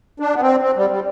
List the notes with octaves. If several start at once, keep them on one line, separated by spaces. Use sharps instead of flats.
D4
B3
C4
C4
G3
G3